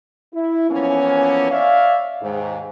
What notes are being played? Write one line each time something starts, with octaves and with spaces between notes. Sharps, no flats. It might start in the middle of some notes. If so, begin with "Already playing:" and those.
E4
E3 F3 A#3 B3 C#4
C#5 D5 E5 F5
D#2 G#2